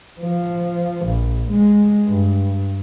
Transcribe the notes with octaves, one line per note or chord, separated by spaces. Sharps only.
F3
A#1
G#3
G2